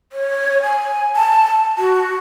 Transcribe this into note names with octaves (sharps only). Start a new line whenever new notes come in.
C#5
G#5
A5
F#4